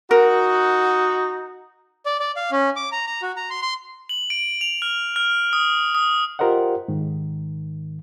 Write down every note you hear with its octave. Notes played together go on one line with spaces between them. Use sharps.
D#4 F#4 A#4
D5
D5
F5
C#4
D6
A#5
A#5
F#4
A#5
C6
C6
F#7
D7
F7
F6
F6
D#6
D#6
F4 G4 A#4 C5 D#5 F#5
G#2 D#3